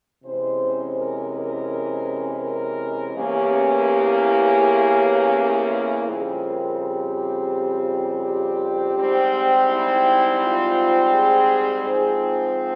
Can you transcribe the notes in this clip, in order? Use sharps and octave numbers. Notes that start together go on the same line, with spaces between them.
C3 E3 G#3 C#4 C5
A#4
A#4
A#4
E2 C#3 E3 A#3 C#4 G4
F2 C#3 G3 C4 G#4
A#4
G4
G4
G#2 G3 C4
E4
F4
G#4
G#2 F3 C4 G#4